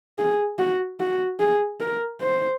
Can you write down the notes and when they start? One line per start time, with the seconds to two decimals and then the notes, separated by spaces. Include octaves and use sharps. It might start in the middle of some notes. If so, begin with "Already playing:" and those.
0.19 G#4
0.59 F#4
1.00 F#4
1.40 G#4
1.80 A#4
2.21 C5